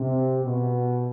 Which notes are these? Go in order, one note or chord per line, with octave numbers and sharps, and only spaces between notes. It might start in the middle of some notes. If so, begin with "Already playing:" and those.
Already playing: C3
B2